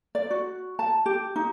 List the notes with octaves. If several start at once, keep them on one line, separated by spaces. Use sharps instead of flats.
D5
F#4
A5
G4
D#4